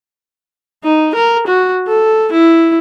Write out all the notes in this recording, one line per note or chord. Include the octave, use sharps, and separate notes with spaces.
D#4
A#4
F#4
A4
E4